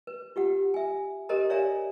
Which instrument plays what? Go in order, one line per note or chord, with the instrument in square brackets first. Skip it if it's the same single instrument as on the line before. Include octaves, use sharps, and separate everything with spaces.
[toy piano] B4
F4 G4 F#5
E5 G#5
G4 A4 A#4 C5 D#5 A#5
C#5 D5 E5 F5 G#5 A#5